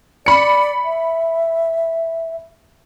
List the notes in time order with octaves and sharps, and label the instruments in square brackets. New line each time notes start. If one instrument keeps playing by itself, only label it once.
[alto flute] D5 [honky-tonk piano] B5 C#7
[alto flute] E5